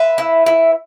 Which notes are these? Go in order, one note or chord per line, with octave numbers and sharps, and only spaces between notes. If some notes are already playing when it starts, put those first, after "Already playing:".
Already playing: B4 E5
E4
E4